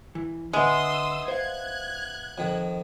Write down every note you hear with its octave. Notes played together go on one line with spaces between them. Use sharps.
E3
D3 G#3 B3 E5 C6 D#6 E6
C5 F5 F#6 G#6
F2 D#3